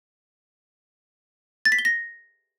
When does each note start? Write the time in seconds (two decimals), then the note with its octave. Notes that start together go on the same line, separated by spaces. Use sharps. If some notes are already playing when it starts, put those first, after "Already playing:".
1.65 A6
1.72 B6
1.79 G7
1.85 A#6